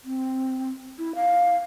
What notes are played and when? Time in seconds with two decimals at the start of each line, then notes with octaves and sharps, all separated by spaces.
0.05 C4
0.99 E4
1.15 F5